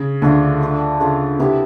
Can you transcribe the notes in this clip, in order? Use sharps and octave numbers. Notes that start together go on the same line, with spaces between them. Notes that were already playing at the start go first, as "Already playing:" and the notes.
Already playing: C#3
D2 D3 A3 D4 F4
A3 D4 F4
C#3 A3 D4 F4
C3 B3 E4 G4